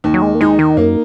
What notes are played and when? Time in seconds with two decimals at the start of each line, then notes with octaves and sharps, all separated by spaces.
0.04 D#2
0.14 F#3
0.22 G#3
0.35 A#3
0.41 G#3 D#4
0.59 D#3
0.77 F#2 A#3